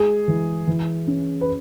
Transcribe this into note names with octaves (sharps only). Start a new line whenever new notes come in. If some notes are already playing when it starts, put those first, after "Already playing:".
Already playing: G#3 G#4
E3
E3
C#4
B4